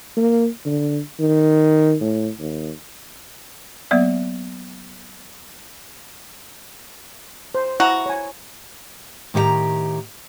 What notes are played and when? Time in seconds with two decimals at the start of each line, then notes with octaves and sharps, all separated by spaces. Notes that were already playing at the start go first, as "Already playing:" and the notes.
0.17 A#3
0.66 D3
1.19 D#3
2.01 A2
2.39 D#2
3.91 F#3 A#3 B3 D5 E5
7.55 C5
7.80 E4 F#4 A#5
8.06 C#5 G#5
9.34 A2 D#3 G4 F5 A#5